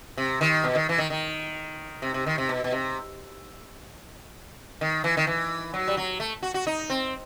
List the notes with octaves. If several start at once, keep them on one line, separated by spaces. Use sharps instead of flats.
C3
D#3
B2
D#3
E3
D#3
D#3
C3
C3
D#3
C3
B2
B2
C3
D#3
E3
D#3
E3
F#3
G3
F#3
A3
F#4
F#4
D#4
C4